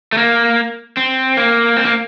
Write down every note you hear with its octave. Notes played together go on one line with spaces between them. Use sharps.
A3
A#3
C4
A#3
C4
A#3